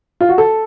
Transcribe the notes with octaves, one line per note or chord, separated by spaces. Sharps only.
F4
F#4
A4